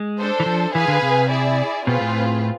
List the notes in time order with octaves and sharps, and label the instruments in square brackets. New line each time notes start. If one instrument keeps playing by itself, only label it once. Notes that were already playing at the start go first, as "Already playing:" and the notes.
Already playing: [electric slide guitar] G#3
[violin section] D4 A4 C5
[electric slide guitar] E3
F3
[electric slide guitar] E3 [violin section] G#4 B4 F5 G#5
[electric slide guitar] D3
C3
[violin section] E4 G#4 D5
[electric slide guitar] B2 [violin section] C4 F4 G#4 B4
[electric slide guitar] A2